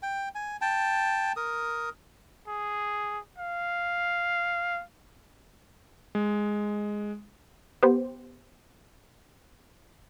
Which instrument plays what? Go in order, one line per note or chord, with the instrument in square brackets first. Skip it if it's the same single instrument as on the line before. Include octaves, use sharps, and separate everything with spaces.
[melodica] G5
G#5
G5 A5
A#4 D#6
[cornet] G#4
F5
[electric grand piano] G#3
[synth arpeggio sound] B3 G4 C5